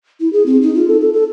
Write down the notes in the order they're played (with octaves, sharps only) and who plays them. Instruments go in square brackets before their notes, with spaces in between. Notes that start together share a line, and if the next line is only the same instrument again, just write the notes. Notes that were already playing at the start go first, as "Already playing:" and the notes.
[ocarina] E4
G#4
C4
D#4
F4
A4
A4
A4